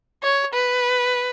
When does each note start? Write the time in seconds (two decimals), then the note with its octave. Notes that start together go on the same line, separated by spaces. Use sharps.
0.23 C#5
0.53 B4